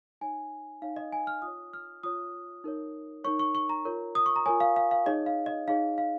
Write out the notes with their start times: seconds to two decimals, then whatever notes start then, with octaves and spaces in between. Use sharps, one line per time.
0.21 D#4 C#5 G#5
0.82 D#4 C#5 F5
0.96 D#5
1.12 G#5
1.27 F6
1.42 F4 D#6
1.47 C#5
1.73 F6
2.03 F4 C#5 D#6
2.64 D#4 A#4 C#5
3.24 D#4 A#4 C#5 C#6
3.39 C#6
3.55 C#6
3.69 A#5
3.85 F4 A#4 C#5
4.15 D#6
4.26 C#6
4.36 A#5
4.46 F4 A#4 C#5 G#5
4.60 F5
4.76 F5
4.91 F5
5.06 D#4 G#4 C#5 D#5
5.26 F5
5.46 D#5
5.68 D#4 G#4 C#5 F5
5.98 F5